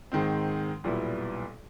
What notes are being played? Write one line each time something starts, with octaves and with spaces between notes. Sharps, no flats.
G#2 D#3 G#3 C4
B1 A#2 G3 B3 E4